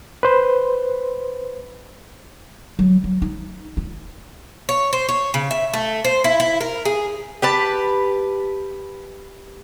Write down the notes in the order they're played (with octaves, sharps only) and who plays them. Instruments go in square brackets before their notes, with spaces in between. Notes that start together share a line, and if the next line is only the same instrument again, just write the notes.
[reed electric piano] B4 C5
[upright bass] F#3
F#3
D#4
F4
[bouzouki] C#5
C5
C#5
C#3
E5
A3
C5
E4
E4
A#4
G#4
G4 B4 A5